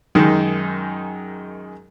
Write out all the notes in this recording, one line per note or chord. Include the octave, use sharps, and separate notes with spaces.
F#2 D#3 G#3 D#4